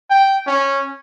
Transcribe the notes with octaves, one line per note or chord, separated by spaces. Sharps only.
G5
C#4